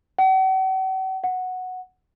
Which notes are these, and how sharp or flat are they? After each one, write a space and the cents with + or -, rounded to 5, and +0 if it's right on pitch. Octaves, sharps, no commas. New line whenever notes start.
F#5 +45
F#5 -5